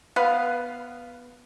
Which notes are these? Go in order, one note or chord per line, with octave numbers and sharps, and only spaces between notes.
B3 B4 F5